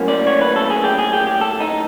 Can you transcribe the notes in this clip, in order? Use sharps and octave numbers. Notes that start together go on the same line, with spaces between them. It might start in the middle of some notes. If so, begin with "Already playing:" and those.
Already playing: A2 F#3 A#3 C#4
D5
C#5
B4
A4
G#4
G4
G#4
G4
G4
A4
D#4